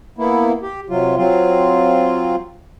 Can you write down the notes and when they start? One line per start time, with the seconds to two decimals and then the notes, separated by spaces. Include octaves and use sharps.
0.18 A#3 B3 E4
0.63 G4
0.90 C3 F#3 F4
1.17 F#3 C4 F4